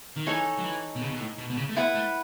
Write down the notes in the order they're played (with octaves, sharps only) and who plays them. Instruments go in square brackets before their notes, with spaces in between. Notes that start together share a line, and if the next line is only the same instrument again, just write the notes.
[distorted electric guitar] D#3
[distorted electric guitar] E3 [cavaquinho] D#4 A4 C#5 G#5
[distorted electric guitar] F#3
E3
B2
C#3
B2
A2
B2
B2
C#3
A3
[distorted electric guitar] B3 [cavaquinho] E4 B4 F#5
[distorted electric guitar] A3